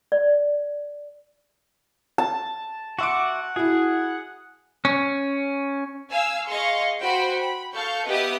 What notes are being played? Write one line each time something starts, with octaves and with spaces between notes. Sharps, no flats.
D5
A5
F#4 E5 F#5 C6 D6 D7
E4 F#4 G#4
C#4
F5 G#5 E6
G#4 D#5 F5 C6 C#6
F#4 C5 G5 B5
B5
A4 F5 C#6 G6
B3 G4 B4 D#5 E5 D#6